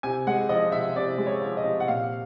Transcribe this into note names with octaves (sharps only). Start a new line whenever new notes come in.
C3 G#5
G#3 F#5
F3 D#5
C3 E5
C3 D5
G#3
C#5
F3
D#5
C3
F#5
A#2 F5